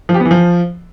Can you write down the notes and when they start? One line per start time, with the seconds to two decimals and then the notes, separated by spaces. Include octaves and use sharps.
0.09 F3
0.14 G4
0.20 B3
0.25 E3
0.31 F3